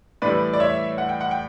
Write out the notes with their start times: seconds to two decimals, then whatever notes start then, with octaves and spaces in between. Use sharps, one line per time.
0.22 A2 E3 G3 B4 D5
0.54 D5
0.60 C#5 E5
0.98 F#5
1.09 G5
1.21 F#5
1.31 G5